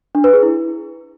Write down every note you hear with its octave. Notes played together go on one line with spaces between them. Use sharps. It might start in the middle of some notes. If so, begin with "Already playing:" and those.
D4
B4
G#4
E4